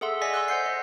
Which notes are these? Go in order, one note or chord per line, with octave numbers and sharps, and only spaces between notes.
G#4 A4 E5 F#5 C6 E6
D5 D#5 G#5 A#6 B6
C6 E6 F#6
C5 F#5 G6 C7
D#5